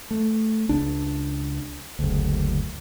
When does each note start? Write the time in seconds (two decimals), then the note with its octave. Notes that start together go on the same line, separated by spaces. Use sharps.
0.11 A3
0.69 C#2 D4
1.99 F#1 D2